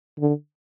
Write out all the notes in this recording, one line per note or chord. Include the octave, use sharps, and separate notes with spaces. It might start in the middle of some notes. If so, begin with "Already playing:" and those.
D3